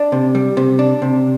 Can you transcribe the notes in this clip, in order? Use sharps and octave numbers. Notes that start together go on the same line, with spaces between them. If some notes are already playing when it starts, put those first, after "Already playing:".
Already playing: D4
C3
G3
C3
D4
C3